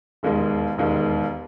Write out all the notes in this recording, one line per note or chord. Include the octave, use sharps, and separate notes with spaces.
E1 D#2 D#3 G#3
E1 D#2 D#3 G#3